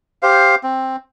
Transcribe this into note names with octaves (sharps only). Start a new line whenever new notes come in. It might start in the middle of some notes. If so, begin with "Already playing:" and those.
G4 C5 F5
C4